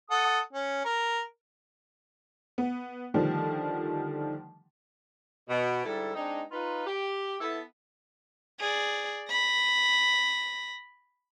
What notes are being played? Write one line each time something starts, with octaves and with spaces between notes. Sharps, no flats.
A4 F#5 D#6
C#4
A#4
B3
D3 D#3 F3 G3 A3
B2
G#2 D3 G3 E4 A4
G#3 C4 D4 D#4
D#4 F4 B4
G4
B3 E4 A4
G#4 D5
B5 A#6